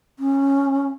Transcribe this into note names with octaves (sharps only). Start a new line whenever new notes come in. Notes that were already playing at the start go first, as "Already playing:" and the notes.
C#4